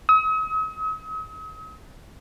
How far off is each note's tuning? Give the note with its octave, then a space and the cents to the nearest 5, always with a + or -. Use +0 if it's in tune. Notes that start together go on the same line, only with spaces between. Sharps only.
D#6 +45